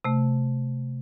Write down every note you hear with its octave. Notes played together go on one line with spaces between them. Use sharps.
C3 A3